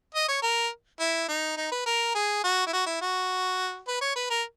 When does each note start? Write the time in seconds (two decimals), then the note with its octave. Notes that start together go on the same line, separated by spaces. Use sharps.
0.15 D#5
0.28 C#5
0.42 A#4
1.00 E4
1.28 D#4
1.57 D#4
1.71 B4
1.86 A#4
2.15 G#4
2.44 F#4
2.67 E4
2.73 F#4
2.86 E4
3.01 F#4
3.88 B4
4.01 C#5
4.16 B4
4.30 A#4